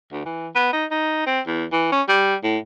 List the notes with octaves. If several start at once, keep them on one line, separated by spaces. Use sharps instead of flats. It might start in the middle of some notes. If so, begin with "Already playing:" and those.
D2
E3
B3
D#4
D#4
C4
E2
E3
C#4
G3
A2